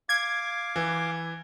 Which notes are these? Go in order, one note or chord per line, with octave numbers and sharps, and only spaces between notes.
F5 D6 G#6
E3